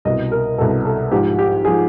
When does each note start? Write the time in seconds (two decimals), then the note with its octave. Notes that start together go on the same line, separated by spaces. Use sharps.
0.05 C2 B2 D#5
0.32 A#4
0.58 C2 B2 A4
0.85 A4
1.11 G#2 F3 G4
1.39 G4
1.65 G#4
1.67 F3